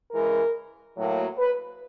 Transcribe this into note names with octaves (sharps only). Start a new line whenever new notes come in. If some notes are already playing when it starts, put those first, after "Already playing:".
C#3 E3 G#3 A#4
A2 F#3 A#3
B4